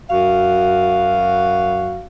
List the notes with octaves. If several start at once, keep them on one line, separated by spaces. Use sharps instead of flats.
F#2 F#4 F5